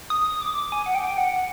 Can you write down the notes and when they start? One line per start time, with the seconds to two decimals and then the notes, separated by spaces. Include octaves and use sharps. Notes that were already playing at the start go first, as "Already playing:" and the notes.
0.10 D#6
0.41 D6
0.72 G#5
0.86 F#5
0.95 G5
1.18 F#5